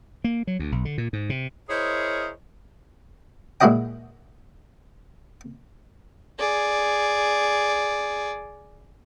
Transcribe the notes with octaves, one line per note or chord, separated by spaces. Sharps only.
A#3
F#3
D2
B1
D3
A#2
G#2
C3
E4 G#4 A#4 C5 C#5 D#5
A#2 G#3 E4 F#4 D#5 G5
G#4 D5